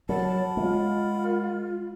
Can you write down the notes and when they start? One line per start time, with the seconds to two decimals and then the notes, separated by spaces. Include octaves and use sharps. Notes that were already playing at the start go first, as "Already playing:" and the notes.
0.09 F#3 A#4 F#5 A5 B5
0.57 G#3 F4